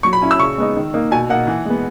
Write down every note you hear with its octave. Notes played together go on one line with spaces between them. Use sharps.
F#3 C#6
B5
C#4 E4
E6
C#3 C#6
G#3 B3 D#4
D#3
A#3 D#4
B2 G#5
A#3 D#4 F#5
E3
G#3 B3